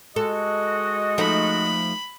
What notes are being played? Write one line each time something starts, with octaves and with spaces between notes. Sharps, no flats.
G#3 F#4 A4 D#5
F3 A3 D#4 B5